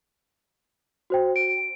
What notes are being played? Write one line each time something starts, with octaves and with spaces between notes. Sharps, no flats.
F#4 C5 G5
D7